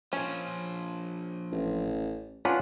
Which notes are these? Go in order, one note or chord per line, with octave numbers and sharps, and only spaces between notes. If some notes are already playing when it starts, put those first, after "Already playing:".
A#2 F3 C#4
A1
C#4 D4 F4 B4 F#5